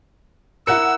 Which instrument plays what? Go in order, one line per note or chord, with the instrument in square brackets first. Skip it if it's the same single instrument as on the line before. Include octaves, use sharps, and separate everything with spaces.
[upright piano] E4 A#4 [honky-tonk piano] F#5 F#6 C#7 [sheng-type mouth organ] E6